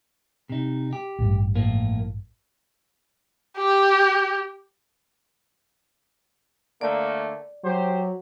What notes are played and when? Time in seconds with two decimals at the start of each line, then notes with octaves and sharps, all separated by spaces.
0.50 C3 D#4
0.93 G4
1.19 A1 G2
1.56 A2 F3 A#3
3.58 G4
6.81 D3 A3 A#3 D5
7.64 F#3 G4 C5